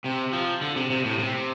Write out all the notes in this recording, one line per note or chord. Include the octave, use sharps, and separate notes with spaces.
C3
F3
D3
C3
C3
A2
C3